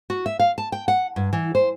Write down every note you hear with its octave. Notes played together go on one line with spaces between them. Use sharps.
F#4
E5
F5
A5
G5
F#5
G2
E3
C5